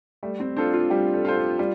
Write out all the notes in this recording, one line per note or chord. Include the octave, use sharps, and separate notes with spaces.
G3 A3
C4
D4 F4 A4 C5
F4
G3 G4
A4
F4 A4 C5
G4
G3 F4